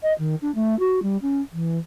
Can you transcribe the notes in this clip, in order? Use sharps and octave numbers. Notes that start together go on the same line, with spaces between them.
D#5
D#3
D4
A3
F#4
G3
C#4
E3